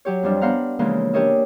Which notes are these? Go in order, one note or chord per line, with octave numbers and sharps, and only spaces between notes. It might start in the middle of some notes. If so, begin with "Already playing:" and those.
F#3 G4 C#5
F2 F3 G3 D4
B3 D4 C5 F5 F#5 A#5
C#3 E3 F3 G#3 A#3
D4 G4 A#4 C#5 D#5 E5